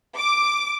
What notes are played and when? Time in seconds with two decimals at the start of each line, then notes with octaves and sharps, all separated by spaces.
0.17 D6